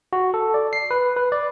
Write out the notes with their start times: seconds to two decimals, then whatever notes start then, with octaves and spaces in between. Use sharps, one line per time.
0.13 F#4
0.34 A4
0.54 D5
0.73 C7
0.91 B4
1.17 B4
1.32 D5